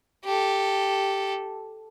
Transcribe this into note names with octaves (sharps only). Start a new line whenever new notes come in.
G4 A4